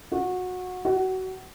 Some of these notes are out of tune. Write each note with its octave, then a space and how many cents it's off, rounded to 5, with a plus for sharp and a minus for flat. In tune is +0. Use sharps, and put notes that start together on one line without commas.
F#4 -20
F#4 +25